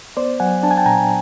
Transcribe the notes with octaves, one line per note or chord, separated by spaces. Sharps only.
B3 C5 D5
F#3 F#5 G#5
D4 A5
G#5
G5 A5
A#2 G#5 A#5